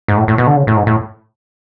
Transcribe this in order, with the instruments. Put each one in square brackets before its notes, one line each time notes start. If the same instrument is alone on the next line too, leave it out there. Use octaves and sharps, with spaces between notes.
[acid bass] G#2
A2
A2
B2
D3
C#3
A2
G#2
A2